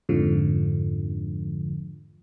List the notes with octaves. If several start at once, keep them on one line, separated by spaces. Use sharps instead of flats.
F2 G#2 D3 F3